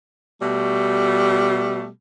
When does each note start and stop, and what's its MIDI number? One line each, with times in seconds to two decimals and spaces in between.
0.42 1.88 47
0.42 1.88 55
0.42 1.88 57